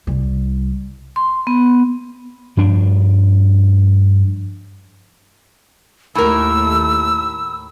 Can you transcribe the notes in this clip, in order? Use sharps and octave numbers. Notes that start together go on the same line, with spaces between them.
C2 G3
C6
B3
G2 F3 D4
D#2 A2 A3 A#4 E6